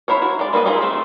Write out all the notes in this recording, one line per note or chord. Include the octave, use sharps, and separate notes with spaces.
E4 A#4 C5 C#5
F#4
G#3 D5
G3 A#3 F4 B4 D#5
D#4 F4 G#4 C5 E5
F3 A3 C4